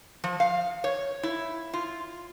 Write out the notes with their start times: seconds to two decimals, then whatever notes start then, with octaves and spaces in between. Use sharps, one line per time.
0.24 F3
0.40 F5
0.84 C#5
1.23 E4
1.73 F4